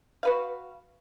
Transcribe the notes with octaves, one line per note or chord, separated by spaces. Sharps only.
F#4 B4 F5